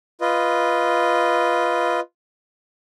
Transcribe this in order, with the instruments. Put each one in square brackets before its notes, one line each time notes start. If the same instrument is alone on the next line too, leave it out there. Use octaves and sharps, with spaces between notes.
[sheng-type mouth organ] F4 B4 D#5